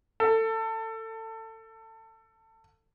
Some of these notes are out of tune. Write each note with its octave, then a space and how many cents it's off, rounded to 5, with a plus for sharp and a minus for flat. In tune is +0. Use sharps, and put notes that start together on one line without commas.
A4 +25